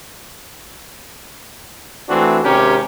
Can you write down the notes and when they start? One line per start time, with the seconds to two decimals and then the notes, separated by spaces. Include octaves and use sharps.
2.09 E3 A3 C4 D4 F#4
2.44 G#1 C3 C#4 G4 A#4